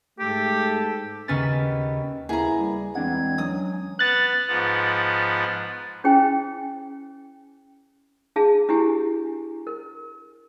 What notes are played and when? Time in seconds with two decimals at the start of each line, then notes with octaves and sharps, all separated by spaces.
0.19 G#2 A3 G4 A4
1.28 D#2 C#3 B3 C#4 B4 A6
2.29 D#2 A#3 B3 E4 G#4 A#5
2.59 G3
2.95 E2 G#3 C4 D4 F#5 G#6
3.38 F#3 C#4 D#6
3.99 B3 F#6 A6
4.48 G#2 F3 B3
6.04 C#4 E4 G#4 C5 G5 G#5
8.36 D4 G#4 F5 A5
8.69 D4 E4 G4 G#5
9.67 A#4